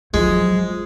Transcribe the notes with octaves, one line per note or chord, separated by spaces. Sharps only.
F3 F#3 G#3